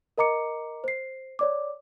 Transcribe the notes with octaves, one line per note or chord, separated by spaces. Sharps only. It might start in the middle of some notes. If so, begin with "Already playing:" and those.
A#4 D#5 A#5 D6 C#7
C5 C7
C#5 D5 D6